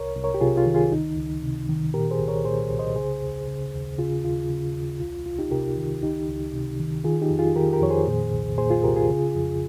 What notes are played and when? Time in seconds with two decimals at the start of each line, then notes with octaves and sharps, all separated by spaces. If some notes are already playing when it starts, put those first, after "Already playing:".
Already playing: C2 A#4 C#5
0.16 C2
0.24 A#4 C#5
0.34 G4
0.41 C3 F4 G#4
0.57 F4
0.66 D#3
0.74 F4 G#4
0.92 C#2 D#4
1.17 C#2
1.42 C3
1.69 D#3
1.94 A#2 G4 A#4
2.11 G#4 C5
2.20 C2
2.28 A#4 C#5
2.45 A#2 G#4 C5
2.70 C2
2.79 C5 D#5
2.96 C#3 G#4 C5
3.21 D#2
3.47 C#3
3.73 D#2
3.98 C#3 F4 G#4
4.24 D#2 F4
4.49 C#3
4.75 D#2
5.00 C2 F4
5.26 C2 F4
5.38 D#4 G4
5.51 C3 G4 A#4
5.77 D#3
6.03 C#2 D#4 G4
6.28 C#2
6.54 C3
6.79 D#3
7.04 D#3 F4 G#4
7.22 D#4 G4
7.30 F2
7.39 F4 G#4
7.56 D#3 G4 A#4
7.73 G4 A#4
7.81 F2 C#5
7.90 G#4 C5
8.07 A#2
8.33 C2
8.57 A#2 G#4 C5
8.70 F4 G#4
8.83 C2 G4 A#4
8.96 F4 G#4
9.10 C#3
9.35 F2